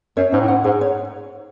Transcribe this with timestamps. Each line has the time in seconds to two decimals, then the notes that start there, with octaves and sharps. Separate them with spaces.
0.17 F#2 C#5
0.32 G#2 C#4
0.41 A2
0.48 G#2 F#5
0.64 G#2 G#4
0.81 C#5